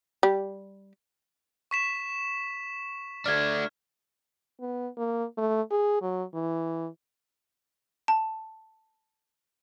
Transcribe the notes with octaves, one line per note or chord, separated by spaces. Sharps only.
G3
C#6 B6 E7
A3 D4 F6 G#6
B3
A#3
A3
G#4
F#3
E3
A5